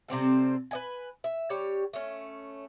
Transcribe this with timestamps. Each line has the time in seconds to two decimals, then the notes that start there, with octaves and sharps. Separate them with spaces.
0.08 C3 G3 C4 A4
0.71 B4 D#5 G#5
1.24 E5
1.50 G3 G4 C#5
1.93 A3 C#4